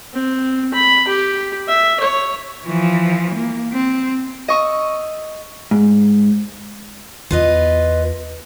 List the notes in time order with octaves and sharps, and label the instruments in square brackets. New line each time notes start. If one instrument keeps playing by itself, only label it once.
[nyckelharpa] C4
B5
G4
E5
C#5
[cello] E3 F3
A#3
C4
[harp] D#5 C#6 E6
[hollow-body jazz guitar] G#2
[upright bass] E2 B3 [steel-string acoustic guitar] F4 B4 D#5